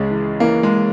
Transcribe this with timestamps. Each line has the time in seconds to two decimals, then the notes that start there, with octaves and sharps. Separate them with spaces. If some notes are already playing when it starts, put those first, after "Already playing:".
Already playing: C#2 C#3 G#3
0.11 E3
0.40 E3 A#3
0.63 G#3